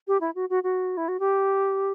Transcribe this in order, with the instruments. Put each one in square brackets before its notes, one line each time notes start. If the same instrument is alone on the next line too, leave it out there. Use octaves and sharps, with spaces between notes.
[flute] G4
E4
F#4
F#4
F#4
E4
F#4
G4